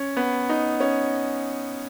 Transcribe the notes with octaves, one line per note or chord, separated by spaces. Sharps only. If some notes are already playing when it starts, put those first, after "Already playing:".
Already playing: C#4
B3
D#4
C#4